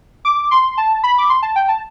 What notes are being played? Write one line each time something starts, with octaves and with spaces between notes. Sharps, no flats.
D6
C6
A5
B5
D6
C6
A5
G5
A5